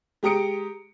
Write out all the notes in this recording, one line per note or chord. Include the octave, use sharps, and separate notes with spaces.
G#3 G4 A#5 D#6 C#7 D7